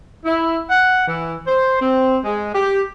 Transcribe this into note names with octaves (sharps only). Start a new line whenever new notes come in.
E4
F#5
E3
C5
C4
G#3
G4